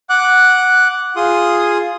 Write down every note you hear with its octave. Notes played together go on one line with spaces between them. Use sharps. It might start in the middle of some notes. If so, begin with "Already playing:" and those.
F#5 D6 F#6
F4 G#4 C6 D#6